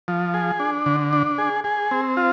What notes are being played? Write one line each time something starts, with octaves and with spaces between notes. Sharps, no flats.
F3
G#4
D4
D3
D4
G#4
G#4
C4
F4